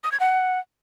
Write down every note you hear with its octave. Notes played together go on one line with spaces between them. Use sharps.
D#6
G#6
F#5